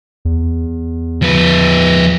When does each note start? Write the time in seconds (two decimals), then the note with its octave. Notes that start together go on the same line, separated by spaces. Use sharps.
0.25 E2
1.22 F3 B4